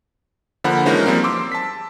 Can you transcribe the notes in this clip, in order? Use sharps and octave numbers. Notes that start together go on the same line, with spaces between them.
D3 F3 A#3 F#5 B5
E3 F3 G#3 C#4 D#4 A#4
F3 G3 A#3 C4
C6 D6 E6
A5 B6